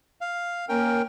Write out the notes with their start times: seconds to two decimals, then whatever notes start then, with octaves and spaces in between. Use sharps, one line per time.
0.21 F5
0.69 A#3 C#4 A#4 G5